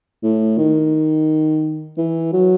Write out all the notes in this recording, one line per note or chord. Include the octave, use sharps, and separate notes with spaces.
A2
D#3
E3
F#3